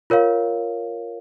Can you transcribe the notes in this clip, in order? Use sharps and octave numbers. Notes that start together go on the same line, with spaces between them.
F4 A#4 C#5 F5